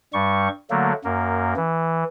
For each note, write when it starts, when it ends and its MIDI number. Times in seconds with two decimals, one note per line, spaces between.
0.13 0.49 43
0.13 0.49 55
0.13 0.49 85
0.70 0.93 50
0.70 0.93 54
0.70 0.93 57
0.70 0.93 58
1.04 1.54 42
1.04 1.54 58
1.56 2.04 52